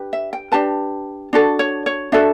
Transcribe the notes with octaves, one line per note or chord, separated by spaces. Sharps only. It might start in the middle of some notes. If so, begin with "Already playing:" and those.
Already playing: D4 G4 B4
E5
G5
D4 G4 B4 A5
D4 F#4 A4
C#5
C#5
D4 F#4 A4 E5